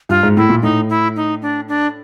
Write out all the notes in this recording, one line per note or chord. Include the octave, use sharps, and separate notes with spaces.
G2 F4
G#2
A2 E4
A#2
A2 D#4
E4
D#4
D4
D4